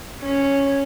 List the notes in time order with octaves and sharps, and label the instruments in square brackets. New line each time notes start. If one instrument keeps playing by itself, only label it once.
[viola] C#4